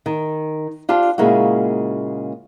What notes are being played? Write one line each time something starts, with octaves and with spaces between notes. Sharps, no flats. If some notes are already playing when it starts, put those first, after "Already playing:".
D#3
D4 F4 G4 C5 A5
A#2 C#3 G#3 A#3 E4 F#4